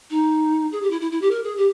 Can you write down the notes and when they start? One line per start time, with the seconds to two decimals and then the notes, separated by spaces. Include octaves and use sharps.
0.11 D#4
0.72 G#4
0.82 G4
0.91 E4
1.01 E4
1.11 E4
1.22 G4
1.31 A#4
1.44 G#4
1.57 G4